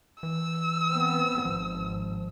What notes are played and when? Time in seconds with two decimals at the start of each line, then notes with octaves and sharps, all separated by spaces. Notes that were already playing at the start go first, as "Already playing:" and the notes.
0.23 E3 E6
0.91 B3 C4
1.45 G#1 F3